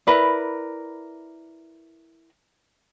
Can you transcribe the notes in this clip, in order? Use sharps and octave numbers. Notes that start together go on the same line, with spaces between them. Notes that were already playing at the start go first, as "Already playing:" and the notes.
E4 A#4 B4 D5